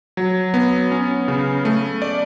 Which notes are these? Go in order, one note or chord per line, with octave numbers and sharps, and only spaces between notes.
F#3
B3
C#4
C#3
A3
D5